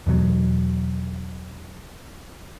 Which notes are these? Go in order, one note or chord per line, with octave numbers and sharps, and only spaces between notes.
E2 B2 F#3